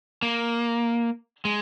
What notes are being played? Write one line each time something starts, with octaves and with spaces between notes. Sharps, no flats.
A#3
G#3